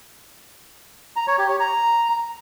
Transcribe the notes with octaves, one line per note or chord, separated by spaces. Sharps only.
A#5
C#5
G4
C#5
A#5